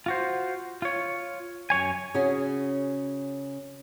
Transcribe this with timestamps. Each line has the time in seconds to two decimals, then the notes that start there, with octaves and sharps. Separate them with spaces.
0.06 F4 F#4 C5
0.82 F4 C#5
1.70 F#2 C#5 G#5
2.14 C#3 C#4 F#4 G#4